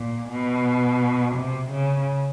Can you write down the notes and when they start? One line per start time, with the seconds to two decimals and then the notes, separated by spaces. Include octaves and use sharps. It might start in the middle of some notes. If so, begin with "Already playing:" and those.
Already playing: A#2
0.30 B2
1.36 C3
1.71 C#3